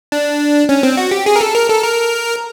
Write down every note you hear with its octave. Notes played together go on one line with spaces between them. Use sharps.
D4
C#4
C4
F#4
G4
G#4
A#4
A4
A#4
A4
A#4